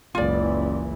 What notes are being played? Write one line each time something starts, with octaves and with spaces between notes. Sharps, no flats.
F#1 C#2 E3 F4 D5